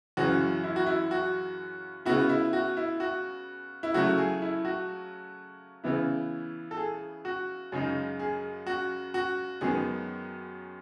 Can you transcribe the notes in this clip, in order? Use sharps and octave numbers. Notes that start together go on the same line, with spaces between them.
F#2 C#3 E3 F#4
E4
F#4
E4
F#4
C#3 G#3 B3 E4 F#4
E4
F#4
E4
F#4
E4
C#3 F#3 A3 E4 F#4
G#4
E4
F#4
C#3 E3 B3 E4
A4
G#4
F#4
F#2 C#3 G#3 D#4 G#4
G#4
F#4
F#4
F#2 D#3 G#3 B3 G#4